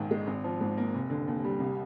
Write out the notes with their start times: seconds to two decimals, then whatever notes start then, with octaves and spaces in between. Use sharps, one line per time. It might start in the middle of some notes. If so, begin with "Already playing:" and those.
Already playing: A#1 G#2 D#3
0.11 G#3
0.27 G#1
0.44 F3
0.61 G#2
0.77 A#3
0.94 F1
1.10 D3
1.27 D#2
1.44 G3
1.60 C2